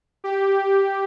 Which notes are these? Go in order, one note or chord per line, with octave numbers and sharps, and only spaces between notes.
G4